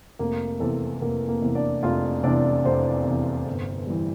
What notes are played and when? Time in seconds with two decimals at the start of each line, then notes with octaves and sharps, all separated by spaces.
0.19 F1 A#3 A#4
0.60 E2 C3 A4
1.02 F1 A#3 A#4
1.29 A#3 A#4
1.42 E2 C3
1.55 D4 D5
1.83 F1 F4 F5
2.23 E2 C3 D4 D5
2.65 F1 C4 C5
3.05 E2 C3
3.47 G1
3.87 E3 G3